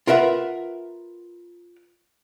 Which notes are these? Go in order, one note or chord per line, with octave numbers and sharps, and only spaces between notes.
F4 A#4 B4 E5 F#5